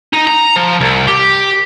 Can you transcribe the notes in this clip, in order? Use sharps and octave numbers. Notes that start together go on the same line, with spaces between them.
D#4
A#5
F3
C2
G4